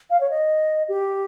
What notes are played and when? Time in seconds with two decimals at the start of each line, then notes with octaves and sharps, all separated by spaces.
0.10 F5
0.21 C#5
0.30 D#5
0.89 G4